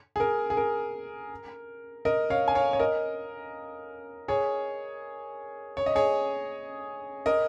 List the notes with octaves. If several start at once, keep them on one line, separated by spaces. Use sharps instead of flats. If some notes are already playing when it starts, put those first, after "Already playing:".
G#4
A#4
G#4
A#4
A#4 D#5
C#5 F5
G#5
C#5 F5
C#5
A#4 D#5
G#4 C#5
C#5
D#5
G#4 C#5
A#4 D#5